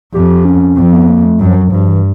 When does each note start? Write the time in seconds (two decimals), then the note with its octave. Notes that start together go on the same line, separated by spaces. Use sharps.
0.14 F2 G4
0.45 C#4
0.77 F2 C4
0.93 B3
1.09 A#3
1.25 A3
1.40 F#2 G3
1.50 F3
1.56 F#3
1.71 G2 F3
1.88 E3